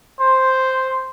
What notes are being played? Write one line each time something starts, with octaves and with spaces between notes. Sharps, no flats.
C5